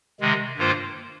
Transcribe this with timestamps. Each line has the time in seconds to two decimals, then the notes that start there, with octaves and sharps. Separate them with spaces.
0.20 C3 D#3 G#3
0.57 G2 D#3 A#3 F4 C5